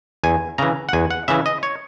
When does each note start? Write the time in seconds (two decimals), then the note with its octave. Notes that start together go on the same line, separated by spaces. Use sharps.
0.24 E2 G#5
0.58 C#3 E3 A#5
0.89 F#5
0.93 E2 G#5
1.11 F#5
1.28 C#3 E3 E5
1.46 D#5
1.63 C#5